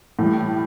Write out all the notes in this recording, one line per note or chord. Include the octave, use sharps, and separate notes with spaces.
A2 E3 G3